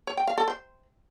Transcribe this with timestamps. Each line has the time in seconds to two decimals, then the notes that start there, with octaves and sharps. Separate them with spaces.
0.07 C#5
0.17 G5
0.27 F5
0.38 A4
0.48 C5